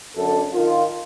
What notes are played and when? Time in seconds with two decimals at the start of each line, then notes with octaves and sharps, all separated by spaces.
0.16 F#2 D3 A4
0.54 D#3 F4